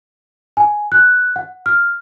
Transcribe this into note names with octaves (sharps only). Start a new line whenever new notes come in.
G#5
F#6
F#5
F6